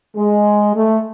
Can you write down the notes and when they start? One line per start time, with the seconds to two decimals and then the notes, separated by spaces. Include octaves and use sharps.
0.16 G#3
0.75 A3